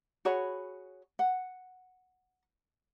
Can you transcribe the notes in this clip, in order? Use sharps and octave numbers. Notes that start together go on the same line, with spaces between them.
F#4 G#4 C#5 B5
F#5